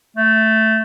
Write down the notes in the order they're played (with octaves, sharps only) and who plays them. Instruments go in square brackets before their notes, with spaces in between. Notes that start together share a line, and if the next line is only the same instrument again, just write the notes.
[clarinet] A3